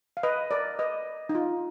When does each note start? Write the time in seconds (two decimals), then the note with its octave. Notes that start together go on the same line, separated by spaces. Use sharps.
0.17 F5
0.23 B4 D#5
0.51 A#4 D5
0.79 B4 D#5
1.29 D#4
1.35 F4